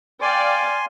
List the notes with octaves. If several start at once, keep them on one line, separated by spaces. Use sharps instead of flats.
D5 F5 G5 G#5 C6